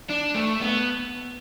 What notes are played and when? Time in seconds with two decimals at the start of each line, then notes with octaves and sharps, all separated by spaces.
0.10 D4
0.35 A3
0.61 B3